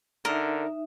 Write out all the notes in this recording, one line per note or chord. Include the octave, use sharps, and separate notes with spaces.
D3 D#4 A#4 E5